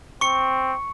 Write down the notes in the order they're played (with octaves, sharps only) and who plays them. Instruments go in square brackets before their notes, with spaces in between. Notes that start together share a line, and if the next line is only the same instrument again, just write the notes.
[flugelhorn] C4 [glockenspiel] C#6 C#7